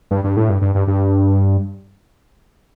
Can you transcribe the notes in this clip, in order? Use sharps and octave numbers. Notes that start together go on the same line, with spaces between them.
G2
G2
A2
G2
G2
G2
G2